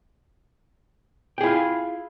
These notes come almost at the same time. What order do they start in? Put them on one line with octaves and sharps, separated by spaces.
G5 G#4 E4 F4